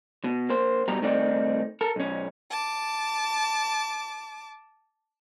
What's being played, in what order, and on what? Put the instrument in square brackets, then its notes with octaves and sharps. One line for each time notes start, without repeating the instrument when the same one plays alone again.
[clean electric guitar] B2
A#3 C5
G2 B2 G3 G4 A#5
G2 D#3 A3 C4 D#4 D5
A4 A#4
B1 C#4
[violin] A5 D6